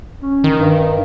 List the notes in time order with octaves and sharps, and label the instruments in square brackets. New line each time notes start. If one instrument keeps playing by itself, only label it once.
[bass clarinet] C#4
[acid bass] D#3
[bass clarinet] G2